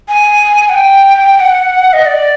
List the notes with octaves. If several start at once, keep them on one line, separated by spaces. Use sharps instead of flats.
G#5
F#5
G5
F#5
D#5
D5